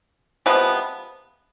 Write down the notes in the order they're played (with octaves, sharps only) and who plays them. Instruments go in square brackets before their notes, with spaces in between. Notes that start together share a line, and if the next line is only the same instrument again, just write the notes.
[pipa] C3 F3 G#3 B3